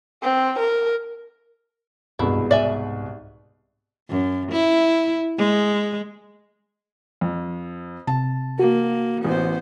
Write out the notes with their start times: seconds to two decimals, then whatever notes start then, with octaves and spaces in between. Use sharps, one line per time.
0.23 C4
0.59 A#4
2.19 C2 G2 B2 G#3 E4
2.51 G#2 D5 E5 G#5
4.09 F#2
4.51 E4
5.38 G#3
7.21 F2
8.07 C3 A5
8.59 A#3 F#4
9.25 A1 B3 C5